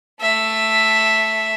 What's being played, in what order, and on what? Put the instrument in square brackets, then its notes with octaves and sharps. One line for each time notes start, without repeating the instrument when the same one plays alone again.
[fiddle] A3 E5